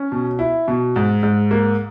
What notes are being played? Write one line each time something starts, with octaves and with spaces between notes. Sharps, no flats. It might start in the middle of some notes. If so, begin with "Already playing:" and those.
Already playing: C#4
B2
E4
B2
G#2
G#2
A#3